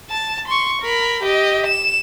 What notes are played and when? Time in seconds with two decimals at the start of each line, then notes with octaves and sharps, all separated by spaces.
0.10 A5
0.48 C6 C#6
0.82 A#4 B5
1.23 G4 D#5
1.66 E7